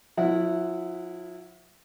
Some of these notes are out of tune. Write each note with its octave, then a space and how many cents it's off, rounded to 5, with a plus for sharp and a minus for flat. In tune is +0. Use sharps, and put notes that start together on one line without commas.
F3 +45 E4 +0 F#5 +0